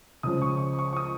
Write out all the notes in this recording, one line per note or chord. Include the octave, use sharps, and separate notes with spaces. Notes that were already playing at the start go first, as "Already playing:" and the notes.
C#2 C#3 F3 D#6
C#6
C#6
C#6
C#6
D#6